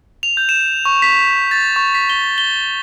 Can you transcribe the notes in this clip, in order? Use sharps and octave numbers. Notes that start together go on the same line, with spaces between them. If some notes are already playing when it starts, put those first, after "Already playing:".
F7
G6
E7
C#6
B6
A6
C#6
B6
G7
G7